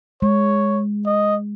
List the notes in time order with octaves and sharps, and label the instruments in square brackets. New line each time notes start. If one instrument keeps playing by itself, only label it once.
[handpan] G#3 [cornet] C#5
[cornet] D#5